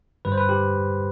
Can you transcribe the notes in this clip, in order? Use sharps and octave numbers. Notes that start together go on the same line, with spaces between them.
G2 D3 G3 B4
C5
B4
G4